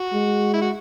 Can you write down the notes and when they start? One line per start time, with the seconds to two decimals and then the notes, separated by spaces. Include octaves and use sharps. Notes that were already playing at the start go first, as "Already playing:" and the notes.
Already playing: F#4
0.13 G#3
0.54 E4
0.61 F#4